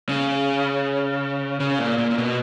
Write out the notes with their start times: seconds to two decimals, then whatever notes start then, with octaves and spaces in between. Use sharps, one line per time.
0.09 C#3
1.60 C#3
1.79 A#2
1.98 A#2
2.11 A#2
2.18 B2